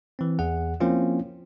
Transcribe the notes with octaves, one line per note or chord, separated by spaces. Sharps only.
E3 C4
E2 G#4 F#5
F3 A#3 C4 C#4 E4 F4